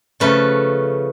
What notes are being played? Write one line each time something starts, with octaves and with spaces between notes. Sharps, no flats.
C#3 F3 A3 B4